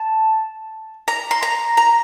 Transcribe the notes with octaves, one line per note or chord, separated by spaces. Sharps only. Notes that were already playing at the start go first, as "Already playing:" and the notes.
Already playing: A5
A#5
C6
A#5
A#5